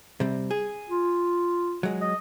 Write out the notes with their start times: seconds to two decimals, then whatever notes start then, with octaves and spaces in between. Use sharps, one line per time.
0.20 C3 G3
0.51 G#4
0.89 F4
1.83 F#3 G#3
2.01 D#5